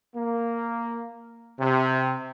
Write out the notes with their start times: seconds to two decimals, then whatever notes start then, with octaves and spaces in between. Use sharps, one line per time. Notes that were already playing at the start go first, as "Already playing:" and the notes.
0.15 A#3
1.59 C3